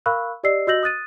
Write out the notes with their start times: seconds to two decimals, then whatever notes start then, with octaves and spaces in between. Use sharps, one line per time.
0.06 A#4 F5 B5 C#6 E6 F#6
0.44 G4 D5 D#5 E6 C7
0.67 F#4 D#5 E6 G6 A#6 F#7
0.83 D#6 F#6 A6 D#7